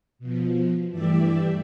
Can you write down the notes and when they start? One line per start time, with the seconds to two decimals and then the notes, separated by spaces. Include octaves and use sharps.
0.19 B2 F3
0.91 G2 E3 A3 G4 D5 E5